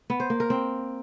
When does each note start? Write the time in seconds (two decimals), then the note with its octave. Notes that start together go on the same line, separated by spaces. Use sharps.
0.10 B3
0.20 C5
0.30 A#3
0.40 A#4
0.50 C4